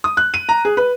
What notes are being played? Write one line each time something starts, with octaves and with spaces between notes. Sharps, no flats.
D#6
F#6
D#7
A#5
G#4
B4